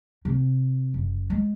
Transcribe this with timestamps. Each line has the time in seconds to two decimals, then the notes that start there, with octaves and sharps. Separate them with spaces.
0.25 C3
0.94 F#1
1.30 G#3